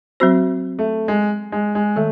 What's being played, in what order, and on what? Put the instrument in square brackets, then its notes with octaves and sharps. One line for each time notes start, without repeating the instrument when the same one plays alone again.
[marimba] F#3 C4 F#4 C5
[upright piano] A3
G#3
G#3
G#3
[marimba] D#3 [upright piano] A3